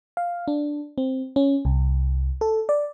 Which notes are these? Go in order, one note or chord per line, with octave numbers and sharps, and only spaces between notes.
F5
D4
C4
C#4
C2
A4
D5